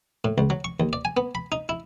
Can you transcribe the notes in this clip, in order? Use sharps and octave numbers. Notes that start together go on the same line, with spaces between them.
A2
C#2
F#3
C#6
D#2
D5
G#5
B3
B5
D#4
E4